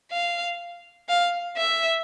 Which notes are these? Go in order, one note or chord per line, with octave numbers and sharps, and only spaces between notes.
F5
F5
E5